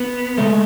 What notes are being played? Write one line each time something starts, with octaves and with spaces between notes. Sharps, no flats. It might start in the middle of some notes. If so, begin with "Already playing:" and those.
Already playing: B3
C#3 G#3 A3